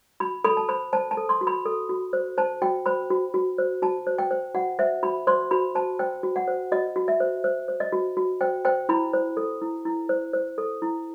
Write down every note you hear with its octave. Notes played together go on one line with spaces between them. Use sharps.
F#4 B5
A4 B5
A5
C5 B5
C5 A5
A5
A4
C6
F#4
B5
A4
F#4
C5
C5 A5
F#4 G5
C5 B5
F#4
F#4
C5
F#4 A5
C5
G5
C5
F#4 F#5
C5 E5
F#4 B5
C5 C6
F#4 B5
C5 A5
C5 G5
F#4
F#5
C5
F#4 D#5
F#4
E5
C5
C5
C5
D#5
F#4
F#4
C5 G5
C5 G5
E4 B5
C5
A4
E4
E4
C5
C5
A4
E4